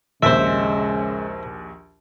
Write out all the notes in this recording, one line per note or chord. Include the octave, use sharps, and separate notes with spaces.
A#1 D#2 C#3 G#3 C5 E5